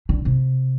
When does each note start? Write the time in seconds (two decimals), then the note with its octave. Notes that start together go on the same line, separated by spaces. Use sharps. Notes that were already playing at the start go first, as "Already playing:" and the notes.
0.09 D3
0.25 C3